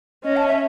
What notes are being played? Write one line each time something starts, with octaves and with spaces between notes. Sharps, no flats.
C#4 D#5
A5
E5